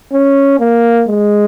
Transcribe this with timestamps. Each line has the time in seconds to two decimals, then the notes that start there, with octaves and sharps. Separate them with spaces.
0.13 C#4
0.60 A#3
1.09 G#3